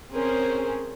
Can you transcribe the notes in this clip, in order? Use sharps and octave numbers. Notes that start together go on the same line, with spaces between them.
C4 C#4 G#4 A#4 C5